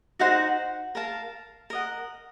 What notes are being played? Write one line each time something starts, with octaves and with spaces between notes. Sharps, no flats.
D#4 F#4 C5 F#5
A#4 F5 A5
A#4 D#5 F#5